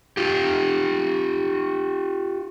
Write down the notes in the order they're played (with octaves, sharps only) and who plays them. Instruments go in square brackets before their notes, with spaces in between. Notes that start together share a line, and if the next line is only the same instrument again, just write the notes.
[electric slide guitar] F4 G4